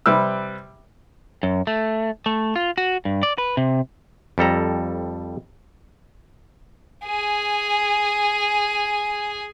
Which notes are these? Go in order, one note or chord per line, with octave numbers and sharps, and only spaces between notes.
C3 G3 B4 E6
F#2
A3
A3
F4
F#4
G2
D5
B4
C3
F2 G3 A4 A#5
G#4 G#5